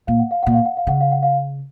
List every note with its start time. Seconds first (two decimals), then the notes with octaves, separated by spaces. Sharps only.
0.07 A#2 F5
0.19 F#5
0.31 F5
0.43 A#2 F#5
0.54 F5
0.65 F#5
0.77 F5
0.87 C#3 F#5
1.01 F5
1.11 F#5
1.23 F5